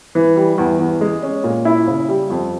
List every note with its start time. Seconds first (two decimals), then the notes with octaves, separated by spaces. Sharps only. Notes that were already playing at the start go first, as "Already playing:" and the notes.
0.15 E3
0.36 G3
0.58 E2
0.79 E2
1.01 G#3
1.23 C#4
1.44 A#2
1.65 E4
1.87 C#3
2.09 G3
2.30 F2